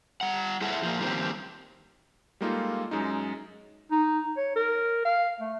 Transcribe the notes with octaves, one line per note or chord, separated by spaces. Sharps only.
G3 F#5
E4 G#4 A4 E5 F#5
F3 G#3 A#3
D#3 F3 G3 A#3 C4
G3 G#3 A#3 D#4 F4 A4
F#2 G#3 D#4
D#4
C#5
A#4
F5
A3